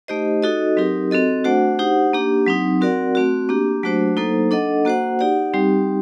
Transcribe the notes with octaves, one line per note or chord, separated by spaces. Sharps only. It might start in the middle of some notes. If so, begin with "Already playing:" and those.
A3 D#4 G4 C5 D#5
D#4 F#4 A4 D#5
F#3 C4 D#4 G4 A#4
C4 F#4 A4 D#5
A3 D4 F#4 C5 F#5
D#4 G4 C5 F#5
A#3 D4 G4
F#3 C4 D#4
C4 F#4 A#4 D5 F#5
A3 C4 F#4
A#3 D4 G4
F#3 A3 D4 F#4 C5
F#3 A#3 D#4 A4 C5
D4 A4 D#5 F#5
A#3 F#4 C5 F#5
D#4 G4 D5 F#5
G3 C4 D#4 G4